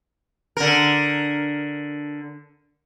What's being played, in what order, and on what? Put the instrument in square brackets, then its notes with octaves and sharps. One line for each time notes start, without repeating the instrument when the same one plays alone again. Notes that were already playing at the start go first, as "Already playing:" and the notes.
[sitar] D3 A#4